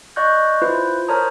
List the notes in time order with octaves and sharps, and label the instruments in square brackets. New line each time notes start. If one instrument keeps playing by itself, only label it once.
[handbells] D5 D#5 C#6 F#6 G6
E4 F4 B4 C5
A#4 C5 C#5 A5 A#5 D#6